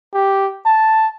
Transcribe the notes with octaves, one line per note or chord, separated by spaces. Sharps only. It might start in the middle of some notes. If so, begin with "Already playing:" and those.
G4
A5